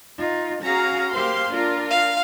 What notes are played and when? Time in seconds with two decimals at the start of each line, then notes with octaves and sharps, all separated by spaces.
0.18 D#4 F4
0.63 C#4 F#4 G#4 F5 A#5
1.14 A#3 G4 C5 F5 C6
1.53 D4 F4 A#4
1.90 F5